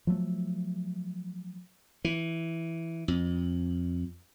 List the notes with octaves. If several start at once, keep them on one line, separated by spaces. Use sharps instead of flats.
F3 F#3 A3
E3
F2